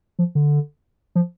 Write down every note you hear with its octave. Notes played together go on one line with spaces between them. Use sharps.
F3
D3
F3